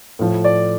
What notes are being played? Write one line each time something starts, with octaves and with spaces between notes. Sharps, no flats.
A2 F3
D5